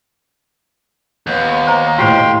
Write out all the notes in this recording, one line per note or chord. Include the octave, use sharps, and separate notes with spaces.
D#2 B3
C5 A#5
A2 F4 G4 C5 F5 G5 C6